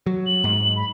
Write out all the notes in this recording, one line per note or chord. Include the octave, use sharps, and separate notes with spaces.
F#3
F#7
G#2
B5